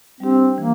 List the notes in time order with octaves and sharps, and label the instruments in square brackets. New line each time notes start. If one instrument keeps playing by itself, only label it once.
[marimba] G3 D4 G4 [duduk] C4
[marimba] E3 [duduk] A#3